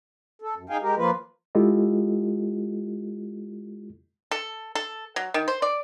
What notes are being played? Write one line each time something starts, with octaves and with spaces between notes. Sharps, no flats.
A4
F#2
D#4 G#4 F5 G5 G#5
G#3 G4 A#4
F3 A#3 F4 B4
G#3 E4 F4 G4 A4 D#5
A4
A4
F#3
D#3
C5
D5